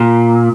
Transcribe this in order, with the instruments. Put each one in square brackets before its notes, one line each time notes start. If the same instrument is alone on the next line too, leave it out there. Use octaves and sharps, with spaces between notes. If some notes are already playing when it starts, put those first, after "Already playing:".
Already playing: [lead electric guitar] A#2